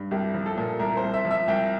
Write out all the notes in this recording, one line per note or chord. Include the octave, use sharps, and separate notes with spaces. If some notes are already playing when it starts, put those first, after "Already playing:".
Already playing: G2
C2 G4
F3
A4
A#2
C2 A#4
C5
C2
E5
F3
E5
C2 G5